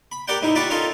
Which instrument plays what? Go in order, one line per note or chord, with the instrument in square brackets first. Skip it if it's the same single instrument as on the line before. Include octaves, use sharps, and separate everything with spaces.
[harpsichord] B5
G4 A#4 D5 F#5 G5
A2 D#4 E4
F4 G4 D5 F#5 B5 C#6
C#4 D#4 F4 A4 A#4 D#5